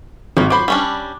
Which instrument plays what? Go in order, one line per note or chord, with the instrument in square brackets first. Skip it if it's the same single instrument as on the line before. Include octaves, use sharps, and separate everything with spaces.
[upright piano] G#1 [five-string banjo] G3 A#3
[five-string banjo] F#3 C5 [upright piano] B5 D6
[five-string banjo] G3 C#4 D4